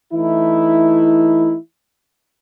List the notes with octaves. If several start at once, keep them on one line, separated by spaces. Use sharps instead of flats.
E3 A3 D#4 E4